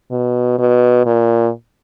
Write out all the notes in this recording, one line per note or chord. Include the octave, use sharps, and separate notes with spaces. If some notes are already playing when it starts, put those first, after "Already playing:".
B2
B2
A#2